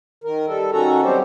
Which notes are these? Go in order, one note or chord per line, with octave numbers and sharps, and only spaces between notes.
D#3 A#4
G3 A4
D#3 C#4 F#4 A4 A#5
F#3 G3 B3 C4 G4 C5